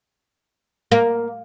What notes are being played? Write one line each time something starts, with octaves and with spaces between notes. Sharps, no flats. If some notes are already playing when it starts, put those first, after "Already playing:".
A#3